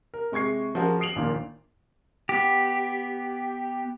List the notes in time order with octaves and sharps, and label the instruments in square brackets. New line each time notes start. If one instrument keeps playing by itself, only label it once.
[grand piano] A#4
C3 G#3 C#6 G#6 C7
F3 C#4 F#4 G#4 A#4
D#6 C7 D7 F7 F#7
A#1 D#2 A#2 D#3
[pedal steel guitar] B3 G4